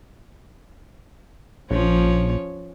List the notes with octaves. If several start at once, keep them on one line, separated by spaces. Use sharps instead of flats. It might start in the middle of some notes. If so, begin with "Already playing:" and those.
A#1 F3 C#4 C#5